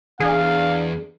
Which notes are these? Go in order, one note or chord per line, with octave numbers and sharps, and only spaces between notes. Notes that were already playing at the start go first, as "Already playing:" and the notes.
E2 D4 G#4 F5